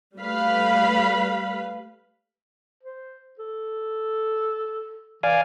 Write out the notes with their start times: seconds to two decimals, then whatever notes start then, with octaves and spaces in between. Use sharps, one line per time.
0.18 G3 A3 B4 F5 B5
2.83 C5
3.39 A4
5.23 E3 D5 F5 G#5